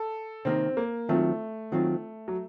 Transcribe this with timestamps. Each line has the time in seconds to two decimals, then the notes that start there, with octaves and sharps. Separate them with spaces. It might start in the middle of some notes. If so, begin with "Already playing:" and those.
Already playing: A4
0.45 C3 D#3 A#3 C4
0.77 A#3
1.09 D#3 F#3 A3 C4 F4
1.72 D#3 F#3 C4 F4
2.28 F#3